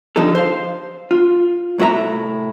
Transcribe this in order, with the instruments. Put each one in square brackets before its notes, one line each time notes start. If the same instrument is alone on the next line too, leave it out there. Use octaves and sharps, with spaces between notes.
[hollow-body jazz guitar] D3 F3 D#4 G4 A4
C5 F5
F4
C2 A2 F#4 E5 A#5